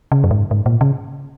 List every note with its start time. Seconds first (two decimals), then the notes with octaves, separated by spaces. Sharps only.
0.12 C#3
0.24 F#2
0.31 G#2
0.51 G#2
0.66 A#2
0.81 C#3